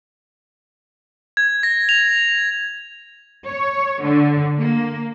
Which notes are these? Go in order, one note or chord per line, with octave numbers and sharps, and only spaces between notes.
G#6
A#6
F7
C#5
D3
A#3